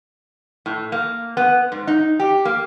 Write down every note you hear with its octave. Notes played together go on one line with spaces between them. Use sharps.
A2
A#3
B3
G#2
D#4
G4
A#3